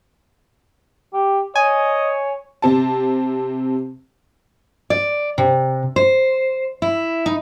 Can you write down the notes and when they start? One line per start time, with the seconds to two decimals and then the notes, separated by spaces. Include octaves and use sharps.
1.13 G4
1.56 C#5 D#5 G#5
2.62 C3 C4 A5
4.90 D5
5.38 C3
5.96 C5
6.82 E4
7.26 D#4